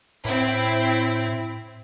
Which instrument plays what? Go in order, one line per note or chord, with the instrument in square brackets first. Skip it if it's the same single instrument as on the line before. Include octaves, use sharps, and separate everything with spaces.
[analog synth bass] A2 [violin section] C4 E4